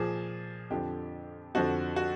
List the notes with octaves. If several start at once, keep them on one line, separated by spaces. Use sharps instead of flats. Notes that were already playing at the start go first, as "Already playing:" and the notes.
Already playing: A#2 F3 G#4
F2 D3 F3 G4
F2 D3 F3 F#4
F#4